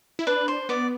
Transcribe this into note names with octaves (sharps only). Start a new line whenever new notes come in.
E4
D4 B4
C5
B3 D5